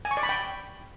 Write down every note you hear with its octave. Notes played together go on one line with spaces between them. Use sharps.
G#5
C#6
D5
B5
G5